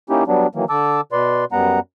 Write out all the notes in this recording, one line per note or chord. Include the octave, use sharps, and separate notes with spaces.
A#3 C#4 D#4 E4 G4
F#3 G3 B3 D4
D#3 E3 F#3 A#3
D3 A5 D6 E6
B2 B4 D5 C6
F#2 G3 B3 F#5 A#5